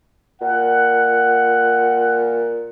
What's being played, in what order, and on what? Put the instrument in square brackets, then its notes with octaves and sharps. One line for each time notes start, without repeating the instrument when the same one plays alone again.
[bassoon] A#2 [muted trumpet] F#5